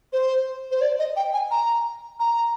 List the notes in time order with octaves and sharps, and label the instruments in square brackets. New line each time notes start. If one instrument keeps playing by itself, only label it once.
[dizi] C5
C5
D5
D#5
G5
G#5
A#5
A#5